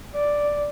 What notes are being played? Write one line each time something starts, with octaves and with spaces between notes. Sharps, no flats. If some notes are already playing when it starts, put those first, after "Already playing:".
D5